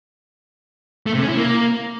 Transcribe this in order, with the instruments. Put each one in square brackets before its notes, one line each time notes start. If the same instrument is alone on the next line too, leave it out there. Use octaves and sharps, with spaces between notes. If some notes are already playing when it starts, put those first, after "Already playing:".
[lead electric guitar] A3
C3
C#4
E4
A#3